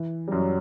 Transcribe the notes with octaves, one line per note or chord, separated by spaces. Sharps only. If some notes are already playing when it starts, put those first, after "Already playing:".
Already playing: E3
G3
F#2 F#3